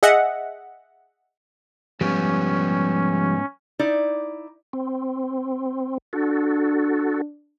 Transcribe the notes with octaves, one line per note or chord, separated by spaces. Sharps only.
G#4 D#5 E5 F#5
G#2 F3 G3 B3 C#4 G4
D#4 E4 D5
C4
D4 F#4 A4